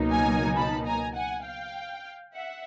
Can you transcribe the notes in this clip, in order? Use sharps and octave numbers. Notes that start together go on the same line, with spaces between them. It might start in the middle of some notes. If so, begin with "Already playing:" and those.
Already playing: C#2 B2 F#3 A#3 D#4
G#5 A#5
A5 B5
G#5 A#5
F#5 G#5
F5 G5
E5 F#5